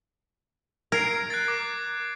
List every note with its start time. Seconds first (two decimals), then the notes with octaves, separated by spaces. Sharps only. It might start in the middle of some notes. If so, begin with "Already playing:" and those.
0.92 A#4 G#6 C7 D7
1.30 F#6 A6
1.48 D6